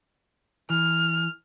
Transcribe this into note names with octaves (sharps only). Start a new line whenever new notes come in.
E3 F6